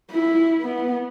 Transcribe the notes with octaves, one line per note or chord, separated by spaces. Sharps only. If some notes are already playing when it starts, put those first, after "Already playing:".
E4
B3